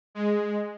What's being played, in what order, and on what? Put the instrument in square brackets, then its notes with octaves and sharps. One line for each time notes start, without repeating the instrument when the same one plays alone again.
[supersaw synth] G#3